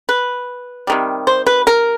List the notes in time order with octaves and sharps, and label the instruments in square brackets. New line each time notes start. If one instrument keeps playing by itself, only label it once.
[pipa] B4
C3 D#3 G3
C5
B4
A#4